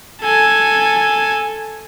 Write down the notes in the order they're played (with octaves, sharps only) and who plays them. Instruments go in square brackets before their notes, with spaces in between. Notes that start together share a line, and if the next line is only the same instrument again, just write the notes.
[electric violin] A4 G#5